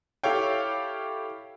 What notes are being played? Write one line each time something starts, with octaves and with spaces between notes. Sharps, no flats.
E4 G4 A4 C#5 F5 G5